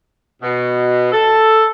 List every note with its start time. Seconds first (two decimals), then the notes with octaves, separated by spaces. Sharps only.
0.42 B2
1.12 A4